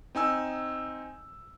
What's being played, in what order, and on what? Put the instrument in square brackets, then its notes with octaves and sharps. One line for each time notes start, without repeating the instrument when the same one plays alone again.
[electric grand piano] C4 D#4 G#5 E6